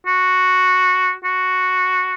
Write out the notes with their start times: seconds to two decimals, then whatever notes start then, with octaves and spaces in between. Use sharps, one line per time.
0.07 F#4
1.25 F#4